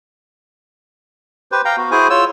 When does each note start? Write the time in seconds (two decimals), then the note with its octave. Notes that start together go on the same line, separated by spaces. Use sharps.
1.52 G4 B4 C5
1.65 F5 G5 A#5
1.77 B3 F#4
1.91 E4 F#4 G#4 C5 G#5
2.10 F4 C#5 E6